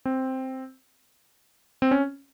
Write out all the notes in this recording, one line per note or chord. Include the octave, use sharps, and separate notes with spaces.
C4
C4
C#4